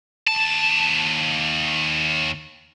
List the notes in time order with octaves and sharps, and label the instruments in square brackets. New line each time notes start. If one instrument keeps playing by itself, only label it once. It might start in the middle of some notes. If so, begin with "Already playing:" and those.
[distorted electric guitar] D#2 A5